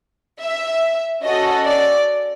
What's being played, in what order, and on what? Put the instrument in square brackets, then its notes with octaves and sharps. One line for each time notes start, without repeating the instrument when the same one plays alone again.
[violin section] E5
C#4 F#4 A4 D#5
D5